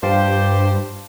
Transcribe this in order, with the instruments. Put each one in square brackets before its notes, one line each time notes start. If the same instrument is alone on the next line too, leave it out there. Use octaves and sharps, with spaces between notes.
[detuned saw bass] G2 [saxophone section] G4 C5 [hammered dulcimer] F5 A5